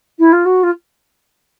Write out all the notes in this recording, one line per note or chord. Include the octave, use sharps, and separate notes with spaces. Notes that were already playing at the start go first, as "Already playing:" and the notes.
E4
F4
F#4
F4